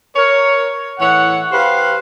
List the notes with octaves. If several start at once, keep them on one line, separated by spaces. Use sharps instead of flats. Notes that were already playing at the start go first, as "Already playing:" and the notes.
A#4 C#5
A2 E3 C#5 F#5
G4 B4 C5 F5